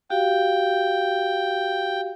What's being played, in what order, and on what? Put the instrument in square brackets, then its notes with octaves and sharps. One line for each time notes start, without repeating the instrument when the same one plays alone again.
[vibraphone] F#4 G4 F5 [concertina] G5